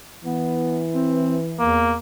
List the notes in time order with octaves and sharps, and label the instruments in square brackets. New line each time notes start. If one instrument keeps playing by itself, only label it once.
[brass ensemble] E3 [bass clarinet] B3
[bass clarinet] C4
[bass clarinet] E2 [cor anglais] A#3